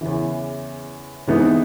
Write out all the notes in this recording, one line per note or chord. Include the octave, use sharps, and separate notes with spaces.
E2 C#3 E3
C3 E3 G#3 B3 D#4